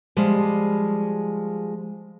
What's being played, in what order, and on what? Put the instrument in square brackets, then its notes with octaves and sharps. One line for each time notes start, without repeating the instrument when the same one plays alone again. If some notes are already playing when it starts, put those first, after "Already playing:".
[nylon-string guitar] F3 G3 G#3